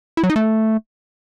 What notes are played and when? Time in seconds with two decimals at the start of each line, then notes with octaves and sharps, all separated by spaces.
0.17 E4
0.23 F#3
0.30 D#4
0.36 A3